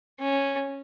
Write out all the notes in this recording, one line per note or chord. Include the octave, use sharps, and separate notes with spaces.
C#4